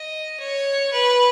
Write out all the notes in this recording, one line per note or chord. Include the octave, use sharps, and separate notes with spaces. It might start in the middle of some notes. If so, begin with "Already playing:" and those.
Already playing: D#5
C#5
B4